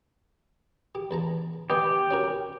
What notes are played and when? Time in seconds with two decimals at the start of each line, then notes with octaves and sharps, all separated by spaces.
0.95 G4
1.11 E2 A5 A#5
1.70 B3 G4 D#5 G#5
2.11 C#4 F#4 A#4